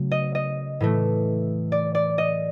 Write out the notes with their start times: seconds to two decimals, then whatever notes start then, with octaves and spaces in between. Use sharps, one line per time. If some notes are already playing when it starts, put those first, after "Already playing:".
Already playing: C#3 F#3 A3
0.12 D#5
0.35 D#5
0.80 A2 E3 A3
1.72 D5
1.95 D5
2.18 D#5